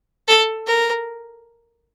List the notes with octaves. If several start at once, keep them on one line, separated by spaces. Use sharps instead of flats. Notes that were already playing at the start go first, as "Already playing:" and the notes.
A4
A#4